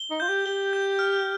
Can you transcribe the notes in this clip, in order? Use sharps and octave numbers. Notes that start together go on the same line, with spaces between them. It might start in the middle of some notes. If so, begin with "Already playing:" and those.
Already playing: G7
D#4
F4 G6
G4
G4 G7
G6
F6